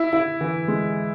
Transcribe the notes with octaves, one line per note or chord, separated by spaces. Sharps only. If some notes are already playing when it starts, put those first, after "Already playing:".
Already playing: E4
E4
E3
G#3